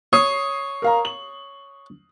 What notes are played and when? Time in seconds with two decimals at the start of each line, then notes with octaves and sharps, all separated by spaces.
0.13 C#5 D#6 C7
0.82 A#4 F5 A#5
1.05 F#7